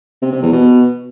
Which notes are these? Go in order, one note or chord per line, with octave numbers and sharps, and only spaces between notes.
C3
C3
E2
B2